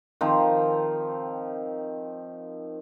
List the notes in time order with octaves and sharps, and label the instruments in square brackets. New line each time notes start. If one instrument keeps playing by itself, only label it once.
[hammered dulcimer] D#3 F3 C4